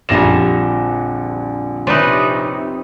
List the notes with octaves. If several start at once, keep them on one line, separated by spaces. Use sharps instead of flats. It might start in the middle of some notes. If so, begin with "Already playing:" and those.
A#1 F2 D3 G3 G#5 A#5 A#6 E7
C3 C4 C#4 D#4 B4 D5